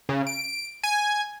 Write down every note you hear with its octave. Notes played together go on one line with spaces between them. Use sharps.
C#3
D7
G#5